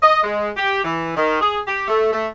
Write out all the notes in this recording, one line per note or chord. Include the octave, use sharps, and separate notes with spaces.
D#5
G#3
G4
E3
D#3
G#4
G4
A3
A3